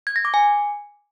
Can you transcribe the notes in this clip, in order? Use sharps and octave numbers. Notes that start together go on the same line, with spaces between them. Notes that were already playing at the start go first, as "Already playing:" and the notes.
G#6
A#6
D6
G#5